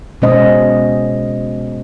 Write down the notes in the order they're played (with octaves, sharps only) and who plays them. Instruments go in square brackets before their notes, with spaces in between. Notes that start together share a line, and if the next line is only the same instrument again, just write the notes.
[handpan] B2 G#3 C#4 C5 D#5